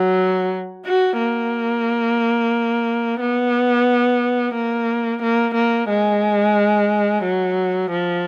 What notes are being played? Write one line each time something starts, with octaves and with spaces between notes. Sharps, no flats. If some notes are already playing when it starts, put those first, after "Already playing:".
Already playing: F#3
F#4
A#3
B3
A#3
A#3
A#3
G#3
F#3
F3